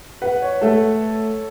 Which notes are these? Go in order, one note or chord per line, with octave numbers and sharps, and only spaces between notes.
B4 F#5
C#5
A3 A4